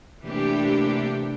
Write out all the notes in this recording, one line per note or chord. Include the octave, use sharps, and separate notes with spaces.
C3 E3 A3 A#3 D4 G4